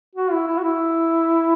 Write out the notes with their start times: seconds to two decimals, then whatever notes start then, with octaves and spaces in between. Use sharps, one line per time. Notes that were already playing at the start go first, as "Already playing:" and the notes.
0.15 F#4
0.32 E4
0.47 E4
0.58 F#4
0.63 E4